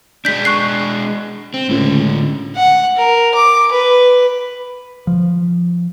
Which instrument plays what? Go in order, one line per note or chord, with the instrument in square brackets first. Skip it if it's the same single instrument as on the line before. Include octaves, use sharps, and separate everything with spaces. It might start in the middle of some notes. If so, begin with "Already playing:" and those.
[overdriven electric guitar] G#3 D4 [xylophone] G6 B6
[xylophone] C#6 F#6 C7
[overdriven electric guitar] C4
[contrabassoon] C#2 [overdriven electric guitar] A2 D3
[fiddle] F#5
A#4
D6
B4
[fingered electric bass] F3